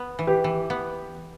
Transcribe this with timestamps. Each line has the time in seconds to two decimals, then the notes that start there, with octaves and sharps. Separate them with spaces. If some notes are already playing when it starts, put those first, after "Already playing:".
Already playing: B3
0.19 E3
0.27 G4 B4
0.44 E3
0.70 B3